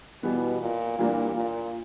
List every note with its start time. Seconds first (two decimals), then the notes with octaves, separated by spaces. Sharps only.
0.23 B2 E3 G3 B3
0.61 A#2
0.99 A#2 E3 G3 A#3 D4
1.36 A#2